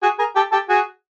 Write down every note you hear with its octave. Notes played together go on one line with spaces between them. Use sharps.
F#4 G#4
G#4 A#4
G4 A4
G4 A4
F#4 G#4